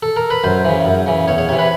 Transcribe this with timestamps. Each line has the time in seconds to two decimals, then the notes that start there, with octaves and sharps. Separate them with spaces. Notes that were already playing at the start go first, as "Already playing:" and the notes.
0.03 A4
0.17 A#4
0.30 B4
0.44 F#2 C5
0.65 C#3 E3
0.85 F#2
1.06 C#3 E3
1.28 E2 C#5
1.38 C#5
1.49 C3 E3 C#5
1.59 B4